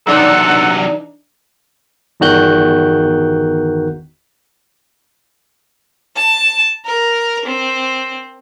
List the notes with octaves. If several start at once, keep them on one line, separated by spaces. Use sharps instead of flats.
C3 E3 F#3 D4 D#4 A4 F#5
G1 E2 D#3 F#4 F#6 G6
A5
A#4
C4